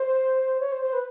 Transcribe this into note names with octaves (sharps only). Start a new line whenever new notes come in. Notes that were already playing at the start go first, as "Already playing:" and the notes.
Already playing: C5
C#5
C5
C5
B4